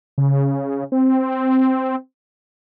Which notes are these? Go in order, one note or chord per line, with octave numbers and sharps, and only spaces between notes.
C#3
C4